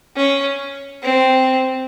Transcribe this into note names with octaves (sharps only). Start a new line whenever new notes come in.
C#4
C4